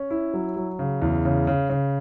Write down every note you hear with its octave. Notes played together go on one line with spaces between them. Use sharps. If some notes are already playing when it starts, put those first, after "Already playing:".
Already playing: C#4
E4
F#3
F#3
C#3
E2
C#3
C#3
C#3